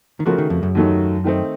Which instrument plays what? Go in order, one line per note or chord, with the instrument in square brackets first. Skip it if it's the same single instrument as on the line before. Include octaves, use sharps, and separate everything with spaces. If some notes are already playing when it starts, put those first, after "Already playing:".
[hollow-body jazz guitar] D#3
[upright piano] C#3 A3 C#4 F#4 A#4 [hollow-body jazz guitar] F3
[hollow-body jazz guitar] D#3
F2
F#2
[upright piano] D#2 D#3 F#3 A3 D#4
D#3 A3 C4 D#4